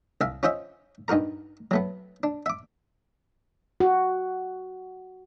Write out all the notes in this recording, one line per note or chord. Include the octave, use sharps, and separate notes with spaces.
C2 E5 F5
C#4 F4 C5 D#5 E5
G2 D#4 F#4 A#4 A#5
F#3 A3 B3
D4
E5 D6
F#4